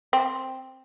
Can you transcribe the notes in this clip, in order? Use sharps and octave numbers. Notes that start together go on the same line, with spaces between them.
C4